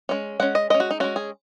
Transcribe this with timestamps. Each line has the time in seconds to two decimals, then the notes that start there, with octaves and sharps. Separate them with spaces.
0.09 G#3 C#4
0.40 G#3 C#4 F#5
0.55 D#5
0.70 G#3 D#5
0.74 C#4
0.80 F#4
0.91 D#4
1.00 G#3 C#4 F#4
1.16 G#4